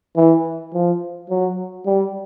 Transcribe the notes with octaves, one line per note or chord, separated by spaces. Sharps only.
E3
F3
F#3
G3